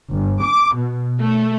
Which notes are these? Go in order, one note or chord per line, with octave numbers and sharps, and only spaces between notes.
G1
D6
B2
A3